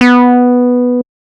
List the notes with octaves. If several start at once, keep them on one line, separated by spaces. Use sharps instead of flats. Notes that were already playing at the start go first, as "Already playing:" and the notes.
B3